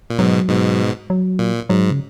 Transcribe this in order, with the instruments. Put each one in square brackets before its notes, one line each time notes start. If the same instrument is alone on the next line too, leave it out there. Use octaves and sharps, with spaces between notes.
[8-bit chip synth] A#2
[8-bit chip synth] G#2 B2 [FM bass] F#3
[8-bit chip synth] G#2 B2
[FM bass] F#3
[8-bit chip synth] A#2
[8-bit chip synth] G#2 [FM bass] F#3
[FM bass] C#3